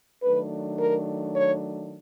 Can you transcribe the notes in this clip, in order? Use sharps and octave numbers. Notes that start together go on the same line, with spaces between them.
D#3 F#3 A3 D4 B4
A#4
C#5